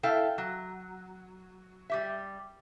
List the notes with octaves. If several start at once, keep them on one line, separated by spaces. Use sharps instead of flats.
E4 A4 E5 F5 G5
F#3
G3 G4 E5